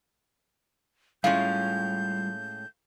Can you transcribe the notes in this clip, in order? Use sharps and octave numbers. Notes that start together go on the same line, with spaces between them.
A2 G3 G#3 C#4 F4 F5 G6